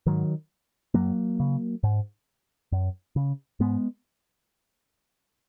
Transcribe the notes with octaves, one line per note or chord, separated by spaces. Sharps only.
G#2 D#3 F#3
F#2 F#3 A#3
C#3
G#2
F#2
C#3
G#2 G#3 B3